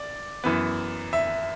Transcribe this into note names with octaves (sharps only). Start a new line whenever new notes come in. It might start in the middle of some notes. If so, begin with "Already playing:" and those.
Already playing: D5
F#2 E3 B3
E5